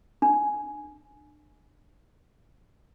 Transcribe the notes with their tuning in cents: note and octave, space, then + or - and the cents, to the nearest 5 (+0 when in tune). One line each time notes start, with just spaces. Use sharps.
D4 +35